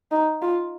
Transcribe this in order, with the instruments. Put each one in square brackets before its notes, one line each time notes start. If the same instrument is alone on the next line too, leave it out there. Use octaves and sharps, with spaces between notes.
[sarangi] D#4
F4